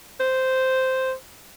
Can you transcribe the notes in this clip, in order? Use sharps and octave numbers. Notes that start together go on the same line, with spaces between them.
C5